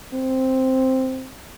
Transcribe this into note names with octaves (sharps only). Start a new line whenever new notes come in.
C4